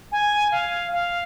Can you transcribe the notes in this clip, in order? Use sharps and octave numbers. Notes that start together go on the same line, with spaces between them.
G#5
F5
F5